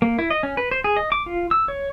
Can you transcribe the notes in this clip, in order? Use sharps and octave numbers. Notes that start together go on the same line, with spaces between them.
A#3
E4
D#5
C#4
B4
C5
G#4
D#5
D6
F4
E6
C#5